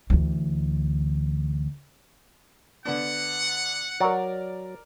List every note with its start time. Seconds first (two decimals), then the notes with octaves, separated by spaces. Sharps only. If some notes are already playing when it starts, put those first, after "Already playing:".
0.10 D2 E3
2.85 D3 B3 D4 F#5
4.00 F#3 A#4 D5